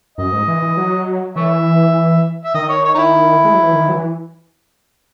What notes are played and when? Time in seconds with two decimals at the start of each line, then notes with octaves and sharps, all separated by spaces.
0.18 F#2 D#5
0.32 G#2
0.48 E3
0.62 E3
0.77 F#3
1.36 E3 C#5 E5
2.45 E5
2.54 D#3 D#5
2.69 C#5
2.85 C#5
2.95 D#4
2.98 E4
3.44 G#3
3.53 F#3
3.63 E3
3.74 D#3
3.89 F#3
3.93 E3